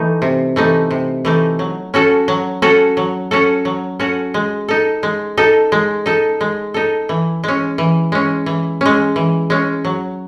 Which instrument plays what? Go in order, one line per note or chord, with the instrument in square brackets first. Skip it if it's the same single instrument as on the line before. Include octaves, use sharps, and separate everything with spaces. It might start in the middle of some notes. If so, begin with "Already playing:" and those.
Already playing: [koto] E3 A3 D#4
C3
E3 A3 D#4
C3
E3 A3 D#4
F#3
C#4 F#4 A4
F#3
C#4 F#4 A4
F#3
C#4 F#4 A4
F#3
C#4 F#4 A4
G#3
D#4 A4
G#3
D#4 A4
G#3
D#4 A4
G#3
D#4 A4
E3
G#3 C#4
E3
G#3 C#4
E3
G#3 C#4
E3
G#3 C#4
F#3